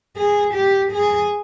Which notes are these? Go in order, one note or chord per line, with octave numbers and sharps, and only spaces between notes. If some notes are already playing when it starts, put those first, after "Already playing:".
G#4
G4
G#4